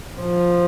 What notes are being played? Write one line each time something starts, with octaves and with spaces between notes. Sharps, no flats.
F3